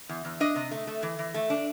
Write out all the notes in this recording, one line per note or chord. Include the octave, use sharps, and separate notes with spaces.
E2
E2
D4 D#5
C3
A3
A3
E3
E3
A3
D4